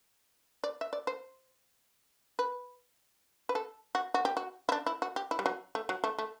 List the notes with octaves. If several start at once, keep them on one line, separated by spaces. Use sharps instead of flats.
D5
E5
D5
C5
B4
B4
A4
F#4
F#4
G4
F#4
E4
D4
E4
F#4
G4
E4
G3
F#3
A3
F#3
A3
A3